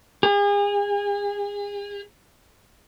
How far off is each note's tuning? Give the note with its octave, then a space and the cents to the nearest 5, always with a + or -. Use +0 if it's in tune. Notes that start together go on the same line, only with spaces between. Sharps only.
G#4 -35